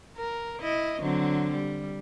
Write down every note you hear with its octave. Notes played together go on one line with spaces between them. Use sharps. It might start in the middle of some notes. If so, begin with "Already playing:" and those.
A#4
E4 D#5
D3 F#3 C4
G3